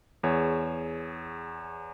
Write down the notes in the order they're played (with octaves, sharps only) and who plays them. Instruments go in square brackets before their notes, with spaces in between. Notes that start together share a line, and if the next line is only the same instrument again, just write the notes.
[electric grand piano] E2 G#4 C#5